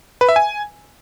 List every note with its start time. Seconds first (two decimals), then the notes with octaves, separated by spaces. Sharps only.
0.21 B4
0.29 E5
0.36 G#5